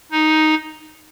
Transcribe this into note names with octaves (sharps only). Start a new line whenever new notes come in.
D#4